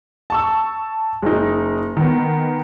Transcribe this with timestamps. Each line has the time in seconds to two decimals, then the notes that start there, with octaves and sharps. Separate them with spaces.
0.30 A5 C#6 E6
1.22 F#1 D#4
1.97 D#3 B3